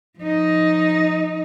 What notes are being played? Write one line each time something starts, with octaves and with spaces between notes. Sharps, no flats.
F3 D#4